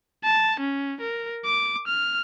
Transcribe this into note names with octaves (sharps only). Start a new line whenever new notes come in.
A5
C#4
A#4
D6
F6